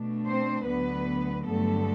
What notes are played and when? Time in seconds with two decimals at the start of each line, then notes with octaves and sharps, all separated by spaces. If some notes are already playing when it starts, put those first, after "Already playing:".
Already playing: B2 A3 D4
0.27 C4 C5
0.66 D2 D3 F#3 B3 B4
1.46 G2 D3 F#3 A3 B3 A4